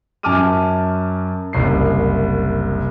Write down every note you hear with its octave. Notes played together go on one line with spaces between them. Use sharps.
F#2 G#5 A5 D6 F6 D#7
F#1 C2 C7